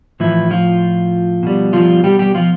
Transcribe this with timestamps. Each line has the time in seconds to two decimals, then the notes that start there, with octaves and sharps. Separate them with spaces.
0.20 A2 E3 F3 E4
0.50 F3 F4
1.43 B2 G3
1.73 F3 F4
2.04 G3 G4
2.19 G3 G4
2.35 F3 F4